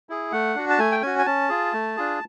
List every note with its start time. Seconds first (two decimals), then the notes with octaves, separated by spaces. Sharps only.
0.09 E4 G#4
0.32 A3 F#5
0.55 D4 F#4
0.70 A5
0.79 A3 G#5
0.92 G5
1.02 C#4 F#4 G#5
1.19 G#5
1.26 C#4 A5
1.49 F4 G#4
1.73 A3
1.97 D4 F4 G#4